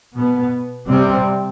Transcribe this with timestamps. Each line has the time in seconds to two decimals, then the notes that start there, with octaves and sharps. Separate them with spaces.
0.16 B2 B3
0.88 C3 G3 C4